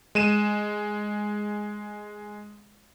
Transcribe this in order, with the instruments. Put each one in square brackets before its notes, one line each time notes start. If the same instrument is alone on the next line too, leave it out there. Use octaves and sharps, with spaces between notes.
[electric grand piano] G#3 D#7 E7